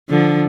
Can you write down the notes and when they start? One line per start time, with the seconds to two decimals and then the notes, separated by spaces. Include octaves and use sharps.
0.10 D3 F3